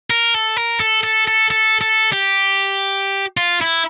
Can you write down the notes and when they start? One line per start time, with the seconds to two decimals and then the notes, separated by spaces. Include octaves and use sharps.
0.10 A#4
0.34 A4
0.57 A#4
0.80 A4
1.03 A4
1.27 A4
1.50 A4
1.81 A4
2.12 G4
3.37 F4
3.61 E4